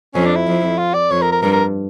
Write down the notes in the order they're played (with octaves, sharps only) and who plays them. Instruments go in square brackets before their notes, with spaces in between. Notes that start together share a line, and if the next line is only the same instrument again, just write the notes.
[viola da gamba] F2 [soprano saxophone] C#4
[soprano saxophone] D4
E4
[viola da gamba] F2
[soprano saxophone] F4
D5
[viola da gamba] F2 [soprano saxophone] C#5
[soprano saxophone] A#4
A#4
[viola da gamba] G2 [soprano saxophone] A#4
[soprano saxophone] A#4